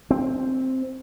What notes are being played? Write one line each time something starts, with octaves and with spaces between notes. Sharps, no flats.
C4